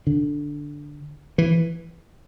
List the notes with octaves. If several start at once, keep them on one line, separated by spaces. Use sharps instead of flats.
D3
E3